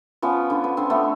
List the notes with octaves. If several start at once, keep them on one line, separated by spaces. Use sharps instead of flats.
F3 B3 C#4
D3
B3
D3 C4
A3 B3